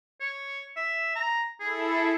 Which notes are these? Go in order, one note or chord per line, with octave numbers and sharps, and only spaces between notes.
C#5
E5
A#5
E4 G#4 A4